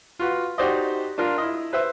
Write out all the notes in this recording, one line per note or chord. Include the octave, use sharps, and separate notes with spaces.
F4 F#4 B4
D#4 F#4 G4 C5 D5 D#5
D4 F4 A#4
E4 D#5
B4 C5 E5